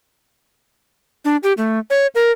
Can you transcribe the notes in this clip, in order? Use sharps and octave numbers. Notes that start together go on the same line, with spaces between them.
D4
G4
A3
C#5
A#4